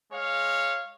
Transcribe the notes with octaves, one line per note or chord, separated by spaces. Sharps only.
G#3 C#5 F5